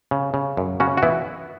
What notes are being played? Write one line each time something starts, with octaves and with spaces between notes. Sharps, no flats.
C#3
C#3
F#2
C#3 C#4 F#4
F#4
E3 B3 E4